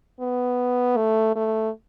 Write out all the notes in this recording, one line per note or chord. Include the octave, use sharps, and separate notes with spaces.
B3
A3
A3